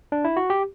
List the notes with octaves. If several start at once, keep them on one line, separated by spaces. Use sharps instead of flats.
D4
E4
F#4
G4